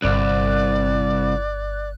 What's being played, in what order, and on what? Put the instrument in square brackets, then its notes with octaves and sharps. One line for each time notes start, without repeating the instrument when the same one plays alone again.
[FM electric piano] G1 F#6 [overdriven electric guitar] C2 [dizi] D5